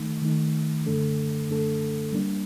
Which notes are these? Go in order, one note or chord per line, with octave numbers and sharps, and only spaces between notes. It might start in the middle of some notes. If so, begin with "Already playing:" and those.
Already playing: D#3 A3 D#4
D#3 A3 D#4
F#2 D3 A3 D4 A4
F#2 D3 A3 D4 A4
G3 A#3 D4